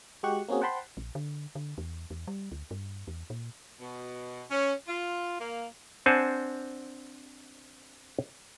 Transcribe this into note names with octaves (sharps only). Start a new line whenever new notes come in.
G#3 F#4 G4 C#6 F#6
A#3 C4 C#4 F#4 G#4
C5 F#5 G5 A5 B5 C6
A#1
D3
D3
E2
E2
G3
D2
G2
E2
A#2
B2
C#4
F4
A#3
C4 D4 C5 F#5 G#5 A5